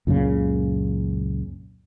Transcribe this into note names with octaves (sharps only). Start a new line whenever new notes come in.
C#2 F#2 A#2 C#3